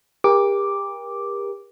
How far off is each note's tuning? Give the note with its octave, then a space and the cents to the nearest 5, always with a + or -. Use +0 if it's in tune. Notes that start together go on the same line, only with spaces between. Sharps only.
G4 +35 A#4 +30 D6 +0